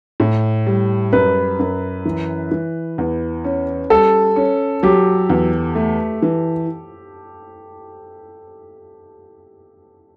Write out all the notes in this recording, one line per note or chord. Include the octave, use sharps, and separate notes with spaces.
A2
G3
F#2 B4
F#2
E3
E3
E2
C#4
G3 A4
C#4
F#3 G4
E2
A3
E3